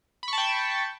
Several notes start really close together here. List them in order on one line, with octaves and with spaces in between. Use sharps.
B5 C#6 A5 G5